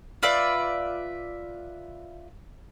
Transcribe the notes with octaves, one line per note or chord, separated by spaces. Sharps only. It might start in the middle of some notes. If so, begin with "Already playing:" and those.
F4 B4 D5 E5